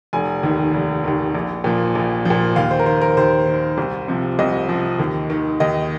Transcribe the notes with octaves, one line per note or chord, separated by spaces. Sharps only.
F1 G#5
D#2 D#3
F1
D#2 D#3
A#1
A#2 F3
A#1
A#2 F3
D#2 F5
C5
A#4
D#3 C5
A#4
D#2 C5
D#3
C2
C3 F3
C2 D#5
C3 F3
D#2
D#3
D#2 D#5